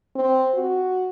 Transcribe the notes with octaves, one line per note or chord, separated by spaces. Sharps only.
C4
F#4